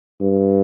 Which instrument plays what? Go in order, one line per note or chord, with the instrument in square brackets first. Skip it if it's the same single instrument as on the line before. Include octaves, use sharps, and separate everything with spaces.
[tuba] G2